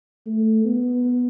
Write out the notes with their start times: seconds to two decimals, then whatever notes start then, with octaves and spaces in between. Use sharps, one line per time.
0.26 A3
0.65 B3